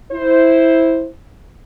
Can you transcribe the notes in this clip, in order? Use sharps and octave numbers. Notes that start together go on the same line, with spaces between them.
E4 C5